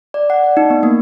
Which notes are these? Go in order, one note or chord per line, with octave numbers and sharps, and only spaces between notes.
D5
F#5
D5
D#4
B3
A#3